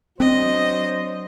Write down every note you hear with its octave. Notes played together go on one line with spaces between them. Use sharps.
F#3 C4 D4 C5 D#5